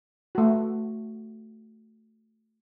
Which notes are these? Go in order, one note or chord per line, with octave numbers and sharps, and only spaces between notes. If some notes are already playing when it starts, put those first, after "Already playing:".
A3 F#4